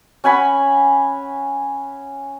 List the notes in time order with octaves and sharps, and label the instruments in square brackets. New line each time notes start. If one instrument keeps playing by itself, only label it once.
[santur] C#4 F#5 G#5 B5